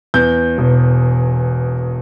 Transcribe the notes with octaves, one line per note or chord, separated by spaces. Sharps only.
E2 G6
E1